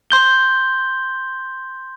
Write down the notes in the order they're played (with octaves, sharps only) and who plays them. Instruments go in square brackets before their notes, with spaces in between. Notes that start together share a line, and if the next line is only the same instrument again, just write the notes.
[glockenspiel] C6 G6 G7